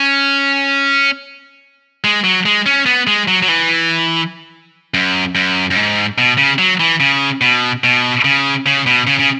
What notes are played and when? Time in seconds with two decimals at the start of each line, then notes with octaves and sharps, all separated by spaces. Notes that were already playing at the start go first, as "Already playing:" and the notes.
Already playing: C#4
2.04 G#3
2.24 F#3
2.46 G#3
2.66 C#4
2.86 B3
3.07 G#3
3.28 F#3
3.42 F#3
3.48 E3
4.94 F#2
5.35 F#2
5.71 F#2
5.76 G#2
6.18 B2
6.38 C#3
6.58 F#3
6.80 E3
7.00 C#3
7.41 B2
7.84 B2
8.25 C#3
8.66 C#3
8.86 B2
9.07 C#3
9.19 C#3